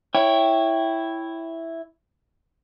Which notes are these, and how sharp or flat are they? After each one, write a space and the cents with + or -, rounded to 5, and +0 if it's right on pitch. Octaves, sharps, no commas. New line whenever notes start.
E4 +0 C#5 +0 G5 +0